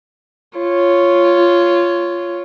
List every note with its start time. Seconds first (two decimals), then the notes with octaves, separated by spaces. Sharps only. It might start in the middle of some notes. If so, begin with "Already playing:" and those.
0.58 F4 C#5